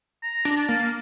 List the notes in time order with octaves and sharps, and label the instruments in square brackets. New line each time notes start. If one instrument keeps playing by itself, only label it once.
[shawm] A#5
[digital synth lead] D4
[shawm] A#5
A5
[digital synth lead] A#3